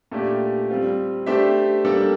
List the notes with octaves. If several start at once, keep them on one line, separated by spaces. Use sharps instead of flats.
A#2 A3 D4 G4 D5
G3 C4 F4
A3 D4 G4 C5 E5
G3 A#3 D4 A4